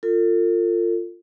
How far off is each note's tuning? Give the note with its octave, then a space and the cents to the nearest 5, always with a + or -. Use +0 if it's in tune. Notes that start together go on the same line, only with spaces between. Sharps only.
F4 +0 A4 +40